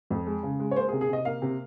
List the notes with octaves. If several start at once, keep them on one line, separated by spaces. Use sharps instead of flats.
F2
G#3
C#3
G#3
C#5
A#3 C5
G#4
C3
G#4
C3 D#5
A#3 F5
C3